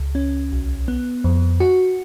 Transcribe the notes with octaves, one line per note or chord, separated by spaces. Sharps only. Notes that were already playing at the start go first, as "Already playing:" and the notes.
Already playing: C#2
C#4
B1
B3
F2
F#4